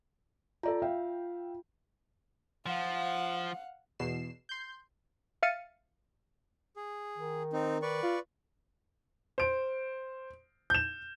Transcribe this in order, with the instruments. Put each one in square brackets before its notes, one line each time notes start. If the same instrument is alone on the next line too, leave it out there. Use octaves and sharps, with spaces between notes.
[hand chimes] F4 [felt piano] A4 D5 A#5
[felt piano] E5 F5 G5
[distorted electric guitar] F3 [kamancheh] F5 F#5
[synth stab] E2 B2 C7 E7
C6 G6
[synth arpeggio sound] E5 F5 F6 A6 C#7 D#7
[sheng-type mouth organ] G#4
[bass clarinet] D#3
[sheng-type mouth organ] C4 D#4
B4 D5 C#6
[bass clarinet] F4
[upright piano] C5 D7
G6 E7